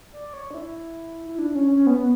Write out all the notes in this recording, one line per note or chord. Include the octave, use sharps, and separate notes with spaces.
D5
C#5
D4
E4
E4
D4
C#4
C#4
B3